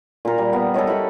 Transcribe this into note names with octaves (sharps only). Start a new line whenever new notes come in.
A#2 A#4
G3
B3
A4 A#4 C#5 D#5
E4 G4 B5 C#6